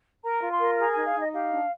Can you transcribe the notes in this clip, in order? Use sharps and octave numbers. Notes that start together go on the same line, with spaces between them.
A#4 A#5
F4
C6
A#4
G#4 A#5
D#4 G#5
F5
D#4 D#5
G4 F5
D4